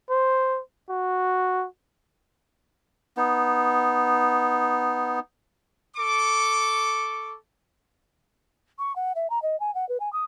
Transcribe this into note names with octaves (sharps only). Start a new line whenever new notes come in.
C5
F#4
B3 D#4
A4 C#6 D6
C#6
F#5
E5
A#5
D#5
G#5
F#5
B4
G#5
D#6